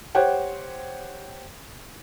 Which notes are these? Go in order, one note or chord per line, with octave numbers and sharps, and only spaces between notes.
G4 C5 C#5 F#5 G5